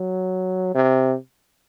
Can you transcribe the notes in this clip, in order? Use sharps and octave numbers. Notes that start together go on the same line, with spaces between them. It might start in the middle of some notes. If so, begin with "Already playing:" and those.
Already playing: F#3
C3